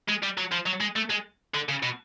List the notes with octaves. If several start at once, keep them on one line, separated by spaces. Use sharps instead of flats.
G#3
G3
F#3
F3
F#3
G#3
A3
G#3
D3
C#3
B2